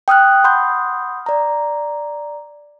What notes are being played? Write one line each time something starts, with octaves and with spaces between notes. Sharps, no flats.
G5 D#6 F6 F#6
F#5 B5 C6 D#6 F6 G6
D5 A#5